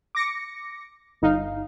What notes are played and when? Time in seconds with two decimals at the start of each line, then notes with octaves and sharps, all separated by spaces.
0.15 D6 A#6 C#7
1.22 G1 D#4 F5